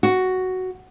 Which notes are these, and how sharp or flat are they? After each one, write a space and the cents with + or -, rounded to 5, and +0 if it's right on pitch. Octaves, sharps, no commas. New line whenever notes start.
F#4 +5